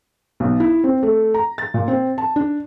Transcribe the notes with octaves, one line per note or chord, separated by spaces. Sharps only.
B1
E4
C4
A3
A#5
A6
A#2
C4
A5
D4